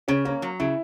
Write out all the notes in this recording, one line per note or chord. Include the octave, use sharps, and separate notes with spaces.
C#3 C#4
A#3 C#4
F#3
C#3 E4